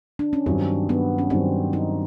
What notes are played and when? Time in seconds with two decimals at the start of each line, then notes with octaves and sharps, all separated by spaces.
0.19 D4
0.33 C#4
0.46 G2 D#3 F#3 C4
0.89 B3
1.18 C#4
1.30 G2 D#3 F#3 C4
1.73 D#4